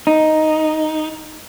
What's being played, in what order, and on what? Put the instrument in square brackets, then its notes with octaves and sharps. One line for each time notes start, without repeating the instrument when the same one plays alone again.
[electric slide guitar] D#4